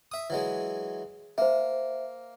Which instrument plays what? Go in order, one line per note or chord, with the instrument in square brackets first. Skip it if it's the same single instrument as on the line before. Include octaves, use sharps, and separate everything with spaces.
[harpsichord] E5 D#6
E3 F#3 G#3
[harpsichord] A#3 [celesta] C5 E5